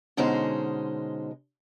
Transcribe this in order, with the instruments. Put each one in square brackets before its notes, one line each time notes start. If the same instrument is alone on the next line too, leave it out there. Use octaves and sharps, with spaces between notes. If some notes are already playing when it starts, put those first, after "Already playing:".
[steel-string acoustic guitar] B2 D3 G#3 C#4 D#4 C5